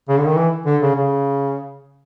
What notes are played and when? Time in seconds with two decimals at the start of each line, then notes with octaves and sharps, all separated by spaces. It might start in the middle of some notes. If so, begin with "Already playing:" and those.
0.09 C#3
0.18 D3
0.27 D#3
0.37 E3
0.66 D3
0.82 C#3
0.96 C#3